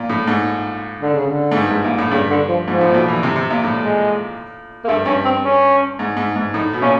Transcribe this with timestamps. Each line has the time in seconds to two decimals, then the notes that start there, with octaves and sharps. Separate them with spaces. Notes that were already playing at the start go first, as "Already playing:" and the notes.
Already playing: A#2
0.09 A2
0.27 G#2
1.01 D3
1.14 C#3
1.27 D3
1.52 G#2
1.56 G2
1.71 G#2
1.84 A#2
1.98 A2
2.11 G2 C#3
2.31 D3
2.49 F3
2.67 G#2 F3
2.81 A2
2.91 A#2
2.94 B2
3.08 E3
3.23 C3
3.36 C3
3.51 A#2
3.64 A2
3.78 G#3
4.84 A#3
4.89 G2 A3
5.05 G2 C#4
5.25 C4
5.44 C#4
5.99 G#2
6.17 G#2
6.36 G#2
6.54 A2 D#4
6.73 B2
6.82 A#2 C#4